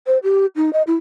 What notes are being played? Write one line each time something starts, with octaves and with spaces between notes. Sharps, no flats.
C5
G4
D#4
D#5
E4